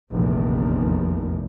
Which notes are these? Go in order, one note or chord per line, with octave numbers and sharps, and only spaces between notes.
F1 A#1 E2 D#3